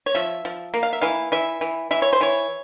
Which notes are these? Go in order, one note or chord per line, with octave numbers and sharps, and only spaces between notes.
C#5
F3 E5
F3
A#3
F5
E5
E3 F5
E3 E5
E3
E3 E5
C#5
C5
E3 C#5